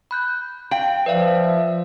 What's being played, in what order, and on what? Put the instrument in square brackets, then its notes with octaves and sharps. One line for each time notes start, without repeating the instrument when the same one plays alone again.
[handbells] B5 F#6 G6
[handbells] F5 [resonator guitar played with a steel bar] G5
[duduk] F3 [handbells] B4 D5 F5 [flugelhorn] E5